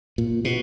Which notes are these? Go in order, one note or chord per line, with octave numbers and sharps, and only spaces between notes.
A#2
B2